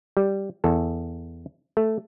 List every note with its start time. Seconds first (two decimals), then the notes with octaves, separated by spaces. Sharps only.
0.17 G3
0.64 E2 A4
1.77 A3